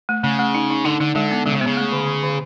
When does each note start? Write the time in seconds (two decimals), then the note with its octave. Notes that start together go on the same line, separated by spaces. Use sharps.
0.09 A3
0.23 C#3 A3
0.39 A3
0.55 D#4
0.70 D#4
0.85 D3 D#4
1.00 D3 D#4
1.15 D3 G#3
1.31 B3
1.46 D3 G#3
1.53 C#3
1.61 C3 B3
1.67 C#3
1.77 A3
1.92 D3
2.07 D3
2.23 D3